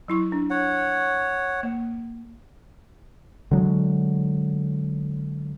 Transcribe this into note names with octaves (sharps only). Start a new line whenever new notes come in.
F#3 E4 C#6
D4
C#5 F#5
A#3
D3 F#3 G#3